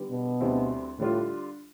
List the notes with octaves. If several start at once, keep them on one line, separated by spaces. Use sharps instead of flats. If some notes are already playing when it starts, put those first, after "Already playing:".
Already playing: D3 G3 B3
B2
D2 D3 G3 C4 E4
A2 D3 G3 D4 F4